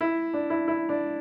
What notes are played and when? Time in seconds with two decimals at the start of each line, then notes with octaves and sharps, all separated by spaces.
0.01 E4
0.33 D4
0.50 E4
0.68 E4
0.89 D4